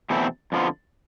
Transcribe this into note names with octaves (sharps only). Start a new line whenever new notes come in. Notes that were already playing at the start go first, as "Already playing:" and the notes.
E2 B2 A3 C4 E4
F2 D3 F3 B3 F4